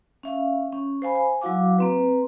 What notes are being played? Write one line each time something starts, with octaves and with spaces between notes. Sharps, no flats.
C#4 E5 F5
C#4
C5 F5 G#5 B5
G#5
F#3 E4 F#4 F5 D6
A#3 C4 B4